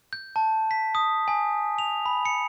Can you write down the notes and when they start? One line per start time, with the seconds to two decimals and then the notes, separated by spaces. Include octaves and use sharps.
0.13 G6
0.36 A5
0.71 B6
0.95 D#6
1.28 G#5
1.78 F7
2.06 B5
2.25 C#7